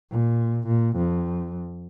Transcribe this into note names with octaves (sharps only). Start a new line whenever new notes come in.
A#2
A#2
F2